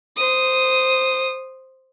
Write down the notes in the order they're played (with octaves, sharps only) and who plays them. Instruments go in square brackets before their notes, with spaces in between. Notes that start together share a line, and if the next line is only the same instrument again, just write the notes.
[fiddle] C5 D#6